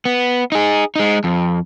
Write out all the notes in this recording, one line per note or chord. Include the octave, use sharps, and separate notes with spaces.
B3
D#4 G#4
G#3 D#4
F2